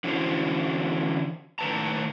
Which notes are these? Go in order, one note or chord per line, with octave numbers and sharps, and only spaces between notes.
D3 E3 C#4 E4 F#4 C5
A2 D#3 B4 A5 A#5